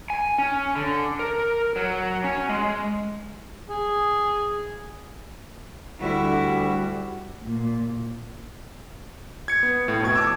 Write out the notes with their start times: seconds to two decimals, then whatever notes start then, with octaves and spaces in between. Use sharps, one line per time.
0.10 G#5
0.38 C#4
0.75 D3
1.19 A#4
1.76 F#3
2.24 C#4
2.49 G#3
3.69 G#4
6.01 D2 G3 E4 F#4
7.44 A#2
9.48 G#6 C#7
9.63 B3
9.88 A2
10.02 F2 B2 C#6 G#6
10.15 A5 D6 E6